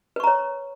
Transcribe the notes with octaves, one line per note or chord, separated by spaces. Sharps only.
B4 C#5 A#5 C#6